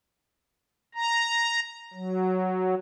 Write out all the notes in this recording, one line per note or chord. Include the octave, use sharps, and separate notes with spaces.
A#5
F#3